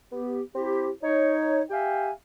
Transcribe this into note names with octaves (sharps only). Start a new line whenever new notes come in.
B3 G4
C4 E4 G4
D#4 C#5
G4 E5 F5 G5 G#5